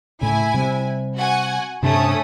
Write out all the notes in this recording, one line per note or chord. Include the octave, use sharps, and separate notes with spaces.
A2 C#3 E4 G#5
C3 G3
F#4 F#5 G#5
G2 C3 A3 C#4 D4 D#6